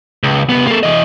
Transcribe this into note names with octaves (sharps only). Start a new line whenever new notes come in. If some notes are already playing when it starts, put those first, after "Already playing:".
C#2
C2 B3
A#3 A4
E3 D#5